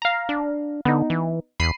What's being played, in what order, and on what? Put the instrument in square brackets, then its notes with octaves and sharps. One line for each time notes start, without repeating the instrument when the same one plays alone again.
[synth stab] F5 A#5
[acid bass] D4
[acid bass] D3 [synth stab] B3 D#4
[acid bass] E3
[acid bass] E2 [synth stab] B5 C7 D#7